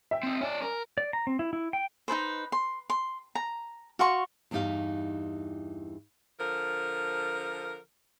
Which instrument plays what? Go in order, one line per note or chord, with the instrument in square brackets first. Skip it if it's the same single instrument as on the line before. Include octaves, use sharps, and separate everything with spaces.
[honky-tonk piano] E5 G5
[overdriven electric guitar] C4 D#4
[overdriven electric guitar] C#4 D5 [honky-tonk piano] G#5
[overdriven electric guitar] A#4
[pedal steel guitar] D5
A#5
C4
E4
E4
G5
[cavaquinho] D#4 A4 B4 C5
C6
C6
A#5
F#4 F5 C6 C#6
[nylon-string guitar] E2 G2 E3 D#4 G4 F5
[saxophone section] D3 F3 A#4